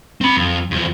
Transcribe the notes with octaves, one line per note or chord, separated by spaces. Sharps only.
C4 B5
F2
E2 F3